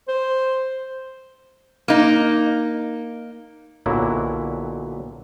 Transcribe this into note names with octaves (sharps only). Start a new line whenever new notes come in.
C5
A#3 D#4
B1 A#2 D3 F#3 E4